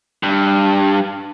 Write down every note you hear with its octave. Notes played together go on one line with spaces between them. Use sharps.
G2